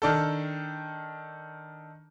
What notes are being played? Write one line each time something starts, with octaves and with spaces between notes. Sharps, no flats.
D#3 D4 A4